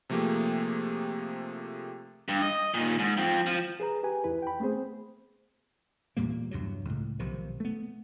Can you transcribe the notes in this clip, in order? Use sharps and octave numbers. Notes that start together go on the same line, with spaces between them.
C3 F3 A3 A#3 G4 G#4
G2
D#5
A#2 D#3
G#2
F3 C4
F3
G#4 B4 A#5
G4 B4 G#5
E2 E4 B4
G5 B5
A3 B3 C4 G#4 C5
E2 A#2 G3 A#3
E2 G2 C3 F#3
C#2 A2
B1 C3 D#3 F3
A3 B3